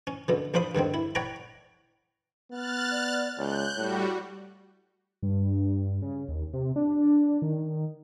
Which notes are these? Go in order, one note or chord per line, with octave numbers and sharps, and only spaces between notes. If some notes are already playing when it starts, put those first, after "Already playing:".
C#4
F#2 B2 D3
A#1 D4 C5 F5 B5 D#6
G2 D3 D#3 C4
E4
C#5 D5 F#5 G5 A#5 B5
B3 F6 F#6 A6
D5
C#2 C#5 F#6 G6
A2 G3 F#4
G2
C#3
D#2
C3
D4
D#3